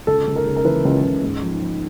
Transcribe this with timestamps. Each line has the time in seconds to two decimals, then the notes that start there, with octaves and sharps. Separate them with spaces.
0.07 C#2 A4
0.27 C#2
0.36 A#4
0.46 C#3
0.56 A#4
0.65 E3 B4
0.85 C#2
1.04 C#2
1.23 G#2
1.41 F3
1.61 F3